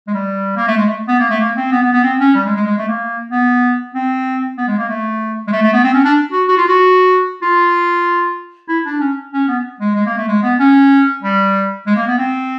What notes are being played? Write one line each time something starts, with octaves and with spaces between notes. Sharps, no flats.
G#3
G3
A#3
A3
G#3
A3
B3
A#3
A3
A#3
C4
B3
B3
B3
C4
C#4
G3
G#3
G#3
G#3
A3
A#3
B3
C4
B3
G#3
A#3
A3
G#3
A3
A3
B3
C4
C#4
D4
F#4
F#4
F4
F#4
F4
E4
D4
C#4
C#4
B3
G#3
G#3
A#3
A3
G#3
B3
C#4
G3
G#3
A#3
B3
C4